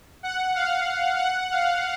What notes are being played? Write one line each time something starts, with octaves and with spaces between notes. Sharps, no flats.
F#5
F5
F#5
F5